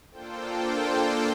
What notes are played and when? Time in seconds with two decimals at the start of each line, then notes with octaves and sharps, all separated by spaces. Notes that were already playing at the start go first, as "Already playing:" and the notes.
0.10 A#3 D4 F4 A4 C5 G5